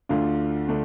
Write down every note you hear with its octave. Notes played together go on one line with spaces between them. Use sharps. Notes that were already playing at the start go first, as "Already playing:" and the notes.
D2 D3 A3 D4 F4
D3 A3 D4